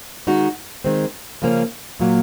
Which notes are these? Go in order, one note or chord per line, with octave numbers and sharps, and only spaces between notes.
D#3 G#3 D#4 F#4
D#3 G#3 C4
C#3 F3 A#3 C#4
A#2 F#3 A#3